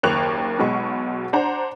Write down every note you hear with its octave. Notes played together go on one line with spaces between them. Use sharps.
F#1 D#2 A#3 C#6 F#6 F7
B1 B2 G#3 B5 C#6
D4 C5 F#5 A#5